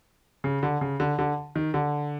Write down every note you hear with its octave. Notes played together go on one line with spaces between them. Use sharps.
C#3
D3
C#3
D3
D3
D#3
D3